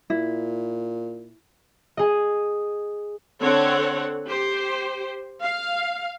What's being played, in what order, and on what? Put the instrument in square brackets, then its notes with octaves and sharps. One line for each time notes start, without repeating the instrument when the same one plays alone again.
[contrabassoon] A#2 [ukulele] E4
[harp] G#4 D#5
[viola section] D3 C4 A4 C#5 F#5
G4 C5
F5